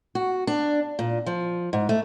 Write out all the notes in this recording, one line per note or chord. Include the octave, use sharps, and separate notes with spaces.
F#4
D4
A#2
F3
G#2
A3